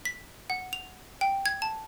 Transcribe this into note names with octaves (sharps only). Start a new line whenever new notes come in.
B6
F#5
F7
G5
G#6
A5